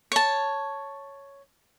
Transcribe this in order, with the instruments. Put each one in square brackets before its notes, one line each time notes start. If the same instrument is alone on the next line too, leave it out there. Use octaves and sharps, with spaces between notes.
[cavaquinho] C#5 A5